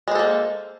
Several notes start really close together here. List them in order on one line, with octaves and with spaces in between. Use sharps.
G#3 C5 A4 A#3